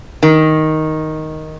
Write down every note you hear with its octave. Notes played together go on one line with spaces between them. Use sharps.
D#3